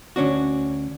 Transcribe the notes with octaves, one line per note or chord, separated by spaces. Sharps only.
D2 C#4 D4 F#4